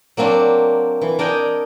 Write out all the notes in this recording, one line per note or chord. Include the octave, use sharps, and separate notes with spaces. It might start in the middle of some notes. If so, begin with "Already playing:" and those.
F#3 A#3 C4 D4
E3
D4 A#4 D#5 G5 G#5